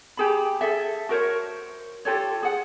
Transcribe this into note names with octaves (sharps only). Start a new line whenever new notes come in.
G4 G#4 B5
G#4 A4 E5
F#4 A#4 C5 C#5
F4 G4 A4 C#5
G#4 F#5